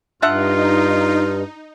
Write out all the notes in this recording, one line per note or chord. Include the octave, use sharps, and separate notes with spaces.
G2 D4 D#4 F4 E5 F#5